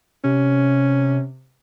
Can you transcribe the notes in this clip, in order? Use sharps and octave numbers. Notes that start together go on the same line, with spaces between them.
C3 C#4